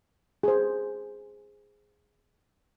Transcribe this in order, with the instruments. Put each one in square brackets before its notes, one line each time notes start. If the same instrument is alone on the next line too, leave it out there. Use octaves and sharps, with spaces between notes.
[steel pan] G#4 C5